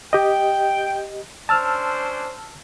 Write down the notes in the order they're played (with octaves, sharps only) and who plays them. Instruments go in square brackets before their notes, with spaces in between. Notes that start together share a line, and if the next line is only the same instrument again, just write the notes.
[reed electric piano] G4 D#5 [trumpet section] G5
[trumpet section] C#4 D4 C5 [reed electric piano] A5 E6 F6